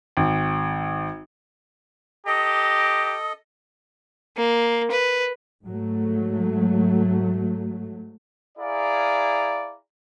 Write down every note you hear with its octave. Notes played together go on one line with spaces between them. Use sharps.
G#1
G4 A4 D#5 A#5 D#6
A#3
B4
G#2 F#3 A3
E4 G#4 D5 F5 A#5